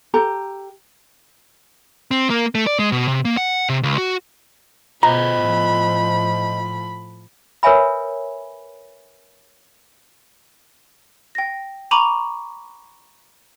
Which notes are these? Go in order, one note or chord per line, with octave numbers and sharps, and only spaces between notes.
G4 A4 A#5
C4
A#3
A3
D5
G#3
B2
C3
A#3
F#5
C3
C#2
F#4
B2 F4 C5 D#5 A#5 B5
A2 F3
A#4 B4 C#5 E5 G#5 B5
G5 A#6
A#5 B5 C#6 D6 D#7 F#7